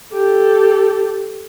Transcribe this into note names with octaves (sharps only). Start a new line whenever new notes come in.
G4 A4